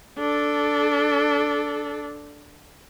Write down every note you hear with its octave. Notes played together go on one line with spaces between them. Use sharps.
D4 A4